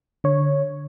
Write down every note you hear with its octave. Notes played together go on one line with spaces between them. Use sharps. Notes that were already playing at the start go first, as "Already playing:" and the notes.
D3 C#5